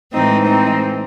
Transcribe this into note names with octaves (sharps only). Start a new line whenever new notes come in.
A2 E3 G#3 C4 D#4
C4 D#4